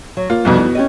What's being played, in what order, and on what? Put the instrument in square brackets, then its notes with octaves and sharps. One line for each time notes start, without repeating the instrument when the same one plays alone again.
[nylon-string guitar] F#3
[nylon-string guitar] A#3 [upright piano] F4
[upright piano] C2 F2 B2 [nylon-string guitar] E3 G3 D#4
[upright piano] B2
[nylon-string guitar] C#4 G4 D#5